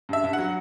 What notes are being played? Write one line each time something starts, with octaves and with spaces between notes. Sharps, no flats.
G2 E5
G2
F#5
F#3